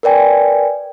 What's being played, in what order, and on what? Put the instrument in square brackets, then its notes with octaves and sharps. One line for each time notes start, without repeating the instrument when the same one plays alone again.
[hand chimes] A#4 B4 D5 G5 G#5